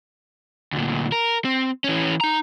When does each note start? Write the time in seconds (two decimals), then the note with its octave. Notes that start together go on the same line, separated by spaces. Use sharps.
0.72 D2 A#2
1.12 A#4
1.45 C4
1.84 E3 C#4
2.21 D#4 A#5